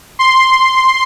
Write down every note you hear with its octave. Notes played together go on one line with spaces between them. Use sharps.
C6